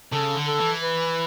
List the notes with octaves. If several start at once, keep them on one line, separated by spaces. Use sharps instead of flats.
C#3 A4
D3
A4
E3
B4